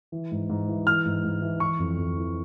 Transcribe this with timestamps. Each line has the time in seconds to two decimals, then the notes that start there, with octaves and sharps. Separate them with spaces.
0.12 E3
0.31 G#2
0.50 G#2
0.68 E3
0.87 E3 F6
1.05 G#2
1.24 G#2
1.42 E3
1.60 E3 C#6
1.79 F2
1.98 F2
2.17 E3